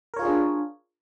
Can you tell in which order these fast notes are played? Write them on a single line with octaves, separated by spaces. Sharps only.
A#4 C#5 F4 G#4 D4